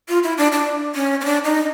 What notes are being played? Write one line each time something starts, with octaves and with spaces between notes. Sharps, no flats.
F4
E4
D4
D4
C#4
C#4
D4
D#4